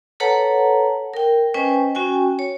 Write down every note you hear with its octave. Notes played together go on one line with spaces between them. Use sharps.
A4 B4 C#5 F#5 A5 A#5
A#4 G5
C#4 B4 C5 D#5 G5 G#5
C#4 F#4 G5 G#5
C#5